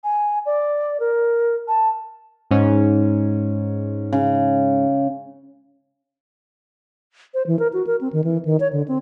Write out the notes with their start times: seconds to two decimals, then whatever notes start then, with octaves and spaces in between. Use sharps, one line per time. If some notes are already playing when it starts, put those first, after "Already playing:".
0.04 G#5
0.46 D5
1.00 A#4
1.68 A5
2.51 G#2 C#4
4.13 C#3
7.34 C5
7.47 E3
7.59 A#4
7.73 F#4
7.87 A#4
8.01 C4
8.13 D#3
8.24 E3
8.45 D#3
8.60 C#5
8.73 D3
8.88 C4